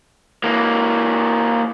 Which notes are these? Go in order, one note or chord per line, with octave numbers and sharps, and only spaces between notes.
E3 A#3